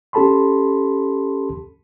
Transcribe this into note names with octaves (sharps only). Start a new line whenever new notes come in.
C#4 G4 A4 A5 B5 C6